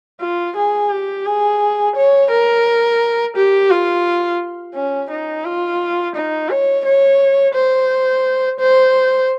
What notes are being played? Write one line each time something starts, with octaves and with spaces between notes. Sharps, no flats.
F4
G#4
G4
G#4
C#5
A#4
G4
F4
C#4
D#4
F4
D#4
C#5
C#5
C5
C5